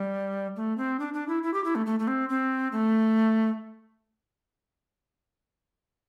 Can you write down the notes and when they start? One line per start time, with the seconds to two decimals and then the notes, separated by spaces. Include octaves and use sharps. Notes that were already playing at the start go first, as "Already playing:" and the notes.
Already playing: G3
0.56 A3
0.78 C4
1.00 D4
1.14 D4
1.28 E4
1.43 E4
1.54 G4
1.64 E4
1.75 A3
1.86 A3
2.00 A3
2.07 C4
2.29 C4
2.72 A3